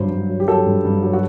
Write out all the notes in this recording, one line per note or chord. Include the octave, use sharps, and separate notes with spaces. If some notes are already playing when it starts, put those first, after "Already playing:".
Already playing: G2 F#3 C5
G2
F#3
G4
F#3 A4
G2
G2
F#3
F#4